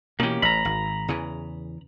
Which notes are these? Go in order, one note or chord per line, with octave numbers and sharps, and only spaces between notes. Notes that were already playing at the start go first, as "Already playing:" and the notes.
B2 E3 A#3 C#4 G4
A1 A#5 B5
G#1
E2 C#3 E3